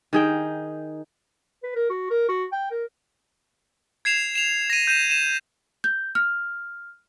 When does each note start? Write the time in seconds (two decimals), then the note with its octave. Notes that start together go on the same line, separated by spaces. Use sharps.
0.13 D#3 G#4 G5
1.63 B4
1.76 A#4
1.90 F#4
2.10 A#4
2.29 F#4
2.52 G5
2.71 A#4
4.05 G#6 C7 E7 F7
4.35 E7 F7
4.70 A#6 D#7
4.87 G6 D#7 E7
5.10 D#7 E7
5.84 G6
6.15 F6